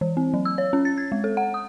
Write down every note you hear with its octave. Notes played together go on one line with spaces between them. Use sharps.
E3
C4
F#3
E6
C#5
C#4
A6
G#6
G#3
A4
F#5
D#6